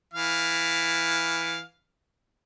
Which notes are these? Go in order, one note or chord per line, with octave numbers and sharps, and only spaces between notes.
E3 F5